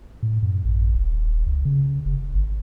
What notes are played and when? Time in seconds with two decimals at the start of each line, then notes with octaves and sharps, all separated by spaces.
0.23 A2
0.43 F#2
0.65 A1
0.95 D#1
1.47 C#2
1.65 C#3
2.05 F1
2.34 G#1